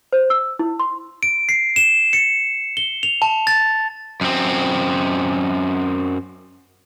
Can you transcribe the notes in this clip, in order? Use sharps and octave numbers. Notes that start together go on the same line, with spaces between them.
C5
E6
E4
C6
D7
C7
E7
C#7
G7
F7
A5
A6
F#2 C4